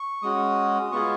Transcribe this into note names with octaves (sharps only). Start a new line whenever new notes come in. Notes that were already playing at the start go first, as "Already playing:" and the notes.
Already playing: C#6
G#3 C#4 F#4 D#6
G#3 B3 F4 G#4 C#6